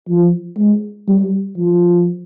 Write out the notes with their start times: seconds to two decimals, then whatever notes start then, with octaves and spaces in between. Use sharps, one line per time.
0.08 F3
0.58 G#3
1.08 G3
1.57 F3